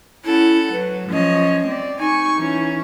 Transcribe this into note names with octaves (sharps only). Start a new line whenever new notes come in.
C#4 E4 A4 F#5
F#3 B4
F3 C#4 C#5 D#5
C4 D5
D#4 G#5 C#6
E3 C#4